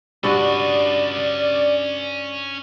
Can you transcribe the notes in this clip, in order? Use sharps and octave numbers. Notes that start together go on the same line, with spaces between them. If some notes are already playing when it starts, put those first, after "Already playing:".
G2 C#4 D4 F#4 D5 D#5